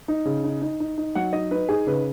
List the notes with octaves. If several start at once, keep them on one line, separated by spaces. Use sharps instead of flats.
D#4
C#3
D#4
D#4
D#4
D#4
F#3 F#5
D#4 D#5
D#4 B4
D#4 G#4
C#3 B4